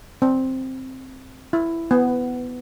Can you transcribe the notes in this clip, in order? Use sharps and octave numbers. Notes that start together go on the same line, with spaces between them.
C4
E4
B3